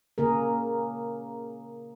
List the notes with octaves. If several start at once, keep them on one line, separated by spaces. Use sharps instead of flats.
C#3 A#3 G#4 A#4